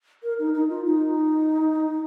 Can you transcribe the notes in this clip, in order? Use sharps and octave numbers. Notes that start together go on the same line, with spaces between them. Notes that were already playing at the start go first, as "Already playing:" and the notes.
A#4
D#4
D#4
F4
D#4